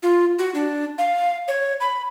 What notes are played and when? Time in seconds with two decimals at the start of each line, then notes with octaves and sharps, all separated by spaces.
0.03 F4
0.39 F#4
0.55 D4
0.98 F5
1.48 C#5
1.81 B5